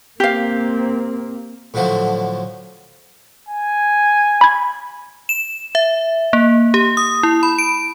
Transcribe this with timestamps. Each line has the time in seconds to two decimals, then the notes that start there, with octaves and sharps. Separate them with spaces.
0.20 A#3 C4 G4 F5
1.74 A2 D3 F3 F#3 A3
3.49 G#5
4.41 B5 G#6
5.29 E7
5.75 E5
6.33 A#3
6.74 G4
6.97 D#6
7.23 E4
7.43 B5
7.59 D7